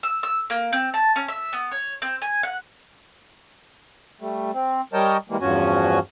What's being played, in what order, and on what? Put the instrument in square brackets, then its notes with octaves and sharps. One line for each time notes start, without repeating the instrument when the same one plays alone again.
[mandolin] E6
E6
A#3
C4
A5
C#4
E5
B3
C#5
C4
G#5
F#5
[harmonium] G3 A3
C4
G3 A#4 C#5 D#5 G5 A5
E3 G3 G#3 A#3
E2 G2 F3 C#4 F#4 G#5